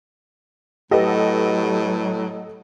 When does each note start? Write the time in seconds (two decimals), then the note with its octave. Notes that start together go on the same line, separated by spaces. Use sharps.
0.91 A2 F#3 G4 A4 B4 D#5 F#5